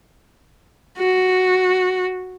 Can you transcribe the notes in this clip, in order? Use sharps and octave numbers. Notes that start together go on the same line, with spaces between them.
F#4